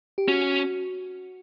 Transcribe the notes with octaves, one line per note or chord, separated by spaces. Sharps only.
G4
C#4 F#4